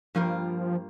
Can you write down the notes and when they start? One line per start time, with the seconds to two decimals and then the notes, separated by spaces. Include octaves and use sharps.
0.15 G2 F3 G3 A#3 F4 A#4